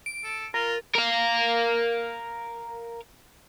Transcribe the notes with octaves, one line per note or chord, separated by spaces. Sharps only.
D7
A4
F4 A#4
A#4 F5